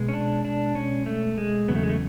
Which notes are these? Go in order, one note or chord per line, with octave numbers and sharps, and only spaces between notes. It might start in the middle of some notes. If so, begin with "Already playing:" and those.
Already playing: B2 G#3
C#4
D4
D4
C#4
A3
G#3
E2 C#3 F#3 B3
A3
G#3
A3